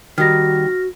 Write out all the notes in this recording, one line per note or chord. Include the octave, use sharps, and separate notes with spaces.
D#3 G3 F#4 F6 A#6